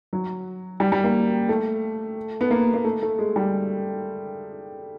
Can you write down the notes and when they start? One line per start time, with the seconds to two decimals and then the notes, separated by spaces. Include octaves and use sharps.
0.13 F#3
0.80 G3
0.92 G3
1.04 A#3
1.49 A3
2.41 B3
2.51 A#3
2.74 A#3
2.84 A3
3.02 A3
3.19 G#3
3.36 G3